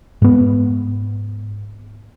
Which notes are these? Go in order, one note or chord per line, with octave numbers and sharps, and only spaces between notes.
G#2 B3